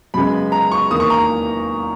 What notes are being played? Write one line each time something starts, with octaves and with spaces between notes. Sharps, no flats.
F#2 C#3 G#3 B3 B5
A#5
C#6
E2 D#3 A#3 D#6
C#6
A#5